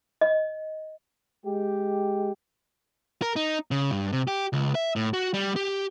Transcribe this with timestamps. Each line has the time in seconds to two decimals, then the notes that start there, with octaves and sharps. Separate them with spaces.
0.21 D#5
1.45 G#3 G4
3.22 A#4
3.36 D#4
3.71 C#3
3.91 G2
4.13 C3
4.27 G4
4.53 C#2
4.75 E5
4.96 A2
5.14 F#4
5.34 G3
5.56 G4